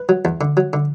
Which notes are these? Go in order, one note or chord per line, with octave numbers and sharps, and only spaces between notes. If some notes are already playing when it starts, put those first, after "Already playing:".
Already playing: B4
F#3
E2
D3
F#3
D3